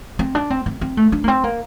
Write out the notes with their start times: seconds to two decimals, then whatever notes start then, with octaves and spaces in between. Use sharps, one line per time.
0.19 C4
0.35 D4
0.50 C4
0.66 C4
0.81 C4
0.97 A3
1.12 D4
1.24 A#3
1.28 C4
1.44 A#3